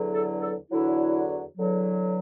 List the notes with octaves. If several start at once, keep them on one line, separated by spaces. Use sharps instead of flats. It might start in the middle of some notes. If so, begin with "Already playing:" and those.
Already playing: E2 D3 F#3
A4
A4
E2 D3 F#3 E4
E2 D3 F#3